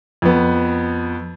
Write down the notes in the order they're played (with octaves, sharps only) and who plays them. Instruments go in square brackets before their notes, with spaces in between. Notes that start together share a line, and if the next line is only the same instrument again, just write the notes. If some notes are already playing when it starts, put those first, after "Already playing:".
[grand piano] F2 B3